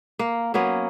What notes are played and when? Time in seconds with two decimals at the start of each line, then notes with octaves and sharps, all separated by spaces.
0.19 A#3
0.54 F#3 A#3 B3 C#4